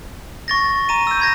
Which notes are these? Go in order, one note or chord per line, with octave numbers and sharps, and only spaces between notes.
C#6 A6 A#6
A#5 D#7
E6 G6
B5 G#6 A#6